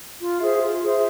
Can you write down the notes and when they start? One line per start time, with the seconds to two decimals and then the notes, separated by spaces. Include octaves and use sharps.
0.20 F4
0.41 G#4 C5 E5
0.61 F4
0.82 G#4 C5 E5